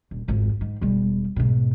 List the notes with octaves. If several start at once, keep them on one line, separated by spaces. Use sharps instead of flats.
D#1
G#1 F2
G#2
E1 G3
G#2 B2